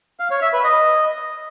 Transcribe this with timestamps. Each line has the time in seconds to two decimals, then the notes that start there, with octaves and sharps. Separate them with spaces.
0.20 F5
0.31 C#5
0.42 E5
0.53 B4
0.64 D#5